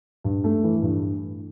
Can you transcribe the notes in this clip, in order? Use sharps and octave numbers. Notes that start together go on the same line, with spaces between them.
G2
A3
E3
G2